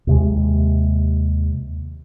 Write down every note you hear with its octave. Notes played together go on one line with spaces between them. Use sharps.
D#2 C3 G#3